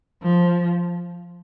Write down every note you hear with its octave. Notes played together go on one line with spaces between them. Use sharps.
F3